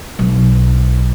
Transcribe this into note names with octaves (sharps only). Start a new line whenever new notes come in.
B1 F#3